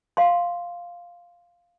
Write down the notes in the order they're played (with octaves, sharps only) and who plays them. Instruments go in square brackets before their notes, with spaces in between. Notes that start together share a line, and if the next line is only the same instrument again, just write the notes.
[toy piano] F5 C6